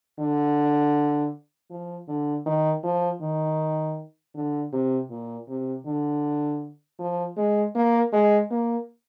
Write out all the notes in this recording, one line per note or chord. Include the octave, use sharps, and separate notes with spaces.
D3
F3
D3
D#3
F3
D#3
D3
C3
A#2
C3
D3
F3
G#3
A#3
G#3
A#3